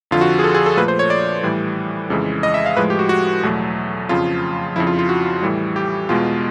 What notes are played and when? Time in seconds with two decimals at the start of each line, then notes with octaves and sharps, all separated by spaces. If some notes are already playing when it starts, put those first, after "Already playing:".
0.11 F2 D3 F3 F4
0.21 F#4
0.39 G#4
0.44 A4
0.54 G#4
0.66 A4
0.77 A#2 F3 A3 B4
0.88 C5
0.99 C#5
1.10 D5
1.43 A2 E3 G3
2.10 F2 C#3 E3 G#3
2.43 D#5
2.54 E5
2.66 F5
2.77 A2 F3 G#3 B4
2.90 G4
2.99 F#4
3.09 F#4
3.43 E2 B2 F#3 A3
4.09 F2 C#3 F3 F4
4.76 F2 C#3 F3 E4
4.87 F4
4.99 F4
5.09 F#4
5.42 A2 E3 G3
5.76 G4
6.09 E2 B2 G#3 F4